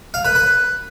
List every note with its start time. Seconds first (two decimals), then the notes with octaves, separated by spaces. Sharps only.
0.14 F5
0.25 B4
0.35 B4